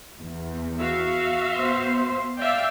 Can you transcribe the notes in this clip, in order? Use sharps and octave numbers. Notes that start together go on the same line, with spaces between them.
E2
F#4 E5 F5
B3 C5
D5 E5 F5 G5